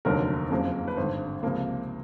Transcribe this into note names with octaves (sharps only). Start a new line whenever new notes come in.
F1 D#2 D3 F#3 A#4
F#1 F2 C#3 F3 A#3
B4
G#1 G2 D3 C5
C#2 C3 F3 A#3